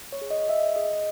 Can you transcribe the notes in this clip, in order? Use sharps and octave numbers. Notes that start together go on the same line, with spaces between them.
C#5
G#4
D#5
G#4 E5
G#4 D#5